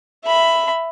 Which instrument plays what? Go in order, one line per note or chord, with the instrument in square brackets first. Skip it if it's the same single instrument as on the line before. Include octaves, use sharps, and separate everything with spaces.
[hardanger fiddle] E5 B5